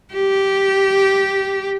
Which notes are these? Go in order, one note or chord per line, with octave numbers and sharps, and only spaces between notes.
G4